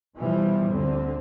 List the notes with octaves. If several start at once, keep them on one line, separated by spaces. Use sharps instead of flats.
B2 E3 F3 G3
D2 D3 C4